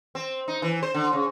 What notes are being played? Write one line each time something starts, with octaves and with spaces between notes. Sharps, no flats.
C4
D#4
E3
C5
D3
C#3